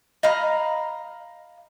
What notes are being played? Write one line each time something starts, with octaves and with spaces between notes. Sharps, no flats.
D#5 F5 A#5 B5